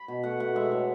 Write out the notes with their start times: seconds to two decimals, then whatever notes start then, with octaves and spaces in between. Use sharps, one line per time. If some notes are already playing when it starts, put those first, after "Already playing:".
Already playing: B5
0.08 B2
0.23 A3 F#5
0.40 B2 F#5
0.55 G#3 E5
0.72 A2